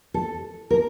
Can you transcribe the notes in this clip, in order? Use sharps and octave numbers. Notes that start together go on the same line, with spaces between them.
A4
A#4